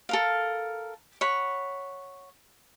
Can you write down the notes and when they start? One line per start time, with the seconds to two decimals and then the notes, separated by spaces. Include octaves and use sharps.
0.09 A4 A#4 F5
1.21 C#5 F#5 B5